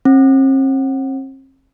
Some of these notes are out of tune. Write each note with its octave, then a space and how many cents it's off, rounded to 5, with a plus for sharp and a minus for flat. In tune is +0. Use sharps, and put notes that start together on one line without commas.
C4 +45